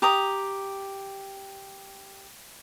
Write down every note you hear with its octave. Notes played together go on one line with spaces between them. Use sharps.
G4 A#5 D#6